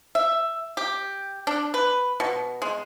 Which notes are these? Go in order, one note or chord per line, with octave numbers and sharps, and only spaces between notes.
E5
G4
D4
B4
B2
G#3